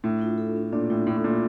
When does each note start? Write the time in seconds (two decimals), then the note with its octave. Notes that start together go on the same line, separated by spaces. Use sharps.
0.04 A2 D4
0.22 F4
0.38 A4
0.56 D4
0.73 A#2 D4
0.90 A2 F4
1.07 A2 A4
1.17 A2
1.24 A#2 D4